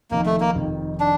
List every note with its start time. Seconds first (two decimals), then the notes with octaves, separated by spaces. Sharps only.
0.11 F1 F2 D#3 A#3
0.26 A3
0.40 A#3
0.55 F1 F2 D#3
1.00 D4